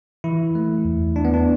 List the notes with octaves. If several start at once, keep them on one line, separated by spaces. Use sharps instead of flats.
E3 E4
A3
E2
E2 D4
B3
D4